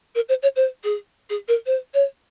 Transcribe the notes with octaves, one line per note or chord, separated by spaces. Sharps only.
A#4
C5
C#5
C5
G#4
G#4
A#4
C5
C#5